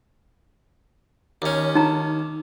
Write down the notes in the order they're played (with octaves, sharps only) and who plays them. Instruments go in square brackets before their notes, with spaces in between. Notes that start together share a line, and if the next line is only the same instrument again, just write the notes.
[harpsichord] D#2 C#4
[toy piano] D#4 A#5